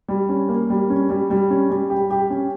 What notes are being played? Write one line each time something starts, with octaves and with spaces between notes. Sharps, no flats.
G3
C#4
A#3
G3
C#4
G3
G3
C#4
G3
G4
G4
C#4